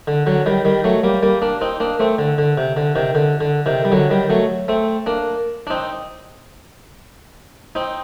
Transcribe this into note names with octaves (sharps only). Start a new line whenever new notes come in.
D3
D3 F#3
D#3 G3
D#3 G3
F#3 A3
G3 A#3
G3 A#3
A#3 D4
C4 D#4
A#3 D4
A3 C4
D3
D3
C3
D3
C3 D#3
D3
D3
C3 D#3
G3
D3 F#3
D#3 G3
F#3 A3
A3 C4
A#3 D4
D4
C4 D#4
C4 D#4